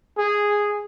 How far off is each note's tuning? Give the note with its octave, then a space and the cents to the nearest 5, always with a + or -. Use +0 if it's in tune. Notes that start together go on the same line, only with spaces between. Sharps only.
G#4 -5